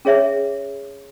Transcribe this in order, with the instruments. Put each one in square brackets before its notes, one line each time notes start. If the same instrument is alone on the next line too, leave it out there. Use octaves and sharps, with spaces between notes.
[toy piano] C#4 G#4 C#5 E5